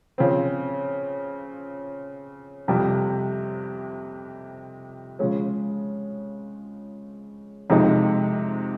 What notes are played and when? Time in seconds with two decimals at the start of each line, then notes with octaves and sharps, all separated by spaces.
0.18 C#3 F3 C4
2.68 F2 C3 G3
5.19 C#3 F3 G#3 C#4
7.70 F2 C3 F3 G#3 D#4